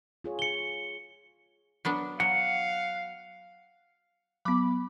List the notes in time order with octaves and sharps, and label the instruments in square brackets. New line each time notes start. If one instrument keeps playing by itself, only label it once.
[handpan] F4 G#4 C#5
[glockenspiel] C#7 G7
[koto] F#3 B3 D4
[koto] F#3 [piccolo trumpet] F5 [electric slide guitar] F#5
[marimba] F#3 B3 [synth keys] B5 D6